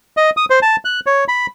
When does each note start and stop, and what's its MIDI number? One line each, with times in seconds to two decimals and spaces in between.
0.17 0.30 75
0.37 0.45 87
0.50 0.59 72
0.62 0.76 81
0.85 1.00 90
1.06 1.24 73
1.28 1.46 83